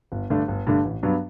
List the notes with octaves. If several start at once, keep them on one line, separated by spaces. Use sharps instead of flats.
G1
G2 D3 A3 D4
G1
G2 D3 A3 D4
A1
G2 F#3 B3 D4